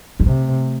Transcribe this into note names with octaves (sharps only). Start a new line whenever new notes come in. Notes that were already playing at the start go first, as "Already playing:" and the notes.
G#3
C3 A3